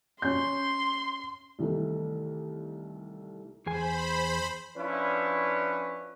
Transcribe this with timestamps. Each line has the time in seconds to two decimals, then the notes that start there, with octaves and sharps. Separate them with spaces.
0.22 C#4 C6 G6
1.59 C2 D#3 E3 A3
3.66 E2 G#4 C5 G#5 B5
4.78 F3 C#4 D4 E4 B4